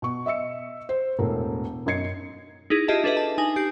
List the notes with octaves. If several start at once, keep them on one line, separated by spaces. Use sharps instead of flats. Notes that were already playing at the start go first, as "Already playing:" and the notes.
B2 C#6
D#5 E5 E6 C#7
C5
E1 A2 A#4
F#2 D#4 D#5 G#6 C7 C#7
D#4 E4 G#4
F4 G4 G#4 D#5 E5 A5
D4 A4 B4 D#5 E5
A5
D#4 G#5 A#6 F#7
G4 G6 C7